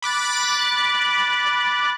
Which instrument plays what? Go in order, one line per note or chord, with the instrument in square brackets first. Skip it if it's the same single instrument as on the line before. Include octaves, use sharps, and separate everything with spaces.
[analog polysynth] B5 D6 F#6 A6